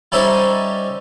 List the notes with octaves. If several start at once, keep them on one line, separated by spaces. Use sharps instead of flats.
G3 C#4 D#4 A4 C5 E5